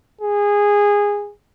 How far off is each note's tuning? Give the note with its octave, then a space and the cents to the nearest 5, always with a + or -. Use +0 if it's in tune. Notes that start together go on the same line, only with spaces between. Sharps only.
G#4 -15